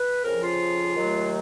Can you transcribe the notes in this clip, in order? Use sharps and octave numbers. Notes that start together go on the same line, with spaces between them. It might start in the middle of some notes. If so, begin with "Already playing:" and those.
Already playing: B4
F2 C#3 F3 A#4
F4
D#2 D#3 F#3 A3